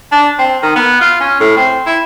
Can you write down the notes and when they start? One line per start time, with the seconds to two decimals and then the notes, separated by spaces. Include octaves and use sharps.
0.12 D4
0.38 C4
0.62 D#3
0.75 B3
1.01 F4
1.20 C#4
1.40 A2
1.57 C4
1.86 E4